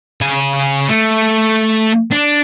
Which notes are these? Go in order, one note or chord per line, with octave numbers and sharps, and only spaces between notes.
C#3 G#5
A3
D4